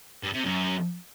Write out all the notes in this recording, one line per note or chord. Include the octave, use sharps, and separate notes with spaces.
G2
C3
F#2